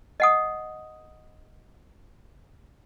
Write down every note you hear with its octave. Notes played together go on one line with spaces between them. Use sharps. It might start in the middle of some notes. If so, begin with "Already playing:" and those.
D#5 F#5 D#6